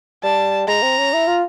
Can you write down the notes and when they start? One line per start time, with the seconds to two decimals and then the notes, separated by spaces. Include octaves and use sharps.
0.23 G3 A5
0.68 G#3 A#5
0.82 C4
0.98 C#4
1.13 E4
1.27 F4